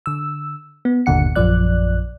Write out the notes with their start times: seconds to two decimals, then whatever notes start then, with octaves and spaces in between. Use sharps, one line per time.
0.06 D3 E6
0.85 B3
1.06 G1 D#2 A#2 D3 F#5 C#7
1.36 A#1 F#2 F3 D5 F#6